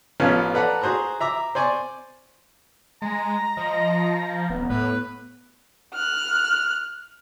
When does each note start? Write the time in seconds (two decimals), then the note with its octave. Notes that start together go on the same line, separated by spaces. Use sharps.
0.20 A1 F3 B3 C#4 F4 F5
0.54 A4 B4 D5 F#5 A#5
0.82 F#4 G#4 C5 A#5 F#6
1.20 E5 A#5 D6
1.55 C5 D5 G#5 C6 C#6
3.02 G#3 A#5
3.57 F3 D#5
4.50 D#1 B3
4.70 A2 B4
5.94 F6 F#6